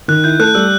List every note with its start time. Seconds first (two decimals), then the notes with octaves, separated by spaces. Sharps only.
0.08 D#3 F#6
0.24 E4 G6
0.39 A3 F#6
0.55 G3 E6